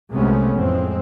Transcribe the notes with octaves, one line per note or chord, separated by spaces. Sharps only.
C2 C3 G#3 A3 B3 C#4
A1 F2 E3 G#3 C4